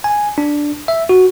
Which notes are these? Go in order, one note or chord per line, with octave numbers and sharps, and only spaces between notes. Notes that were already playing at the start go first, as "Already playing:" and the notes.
G#5
D4
E5
F#4